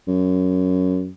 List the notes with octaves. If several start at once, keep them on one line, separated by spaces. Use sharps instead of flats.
F#2